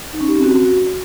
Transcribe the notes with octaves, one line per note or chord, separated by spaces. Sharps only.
D#4
C#4
G4
C4
F#4